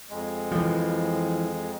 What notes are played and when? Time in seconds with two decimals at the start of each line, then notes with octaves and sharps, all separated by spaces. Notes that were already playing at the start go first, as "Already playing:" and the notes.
0.10 F2 G#3
0.51 E3 F3